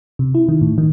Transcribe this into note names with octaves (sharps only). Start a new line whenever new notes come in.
C3
E4
D#3
A2
D#3